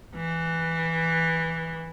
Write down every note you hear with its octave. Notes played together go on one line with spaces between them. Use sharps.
E3